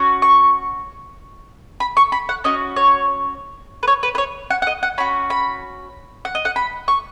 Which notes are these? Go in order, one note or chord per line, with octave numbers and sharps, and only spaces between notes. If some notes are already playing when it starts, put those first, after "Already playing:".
Already playing: C#4 F#4
C#6
B5
C#6
B5
F#5
C#4 F#4 D#5
C#5
B4
C#5
B4
B4
C#5
F#5
F#5
D#5
F#5
C#4 F#4 B5
B5
F#5
D#5
F#5
B5
C#6